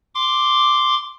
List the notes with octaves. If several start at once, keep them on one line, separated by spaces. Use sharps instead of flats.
C6 D6